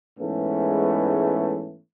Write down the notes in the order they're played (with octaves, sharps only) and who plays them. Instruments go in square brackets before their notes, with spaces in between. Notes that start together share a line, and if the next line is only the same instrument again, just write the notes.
[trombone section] G#2 E3 G#3 A3 B3 C#4